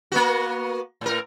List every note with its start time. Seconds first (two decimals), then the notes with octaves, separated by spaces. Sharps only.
0.12 A#3 B3 F#4
1.01 A2 A#4